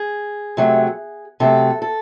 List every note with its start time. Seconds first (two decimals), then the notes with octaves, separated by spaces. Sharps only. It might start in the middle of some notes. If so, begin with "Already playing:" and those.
Already playing: G#4
0.57 C3 F#3 A3
1.40 C3 F#3 A3 A4
1.82 A4